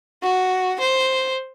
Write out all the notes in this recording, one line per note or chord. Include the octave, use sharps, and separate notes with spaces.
F#4
C5